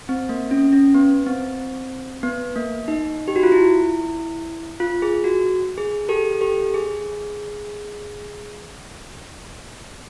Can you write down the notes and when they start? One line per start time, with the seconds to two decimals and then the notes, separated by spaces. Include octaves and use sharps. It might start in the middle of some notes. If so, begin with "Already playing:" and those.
0.09 C4
0.29 A#3
0.51 C#4
0.73 C#4
0.94 B3
1.26 C4
2.23 B3
2.56 A#3
2.88 D#4
3.28 G4
3.36 F#4
3.43 F4
3.52 E4
4.80 F4
5.02 G#4
5.24 F#4
5.78 G#4
6.09 G4 A4
6.41 G4 A4
6.74 G#4